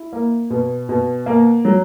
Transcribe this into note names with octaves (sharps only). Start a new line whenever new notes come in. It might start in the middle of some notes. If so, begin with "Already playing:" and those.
Already playing: E4
A#3
B2
B2
A#3
F#3